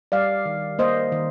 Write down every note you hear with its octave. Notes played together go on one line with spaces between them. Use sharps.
G3 D5 F5
D#3
A#3 C5 D#5
D#3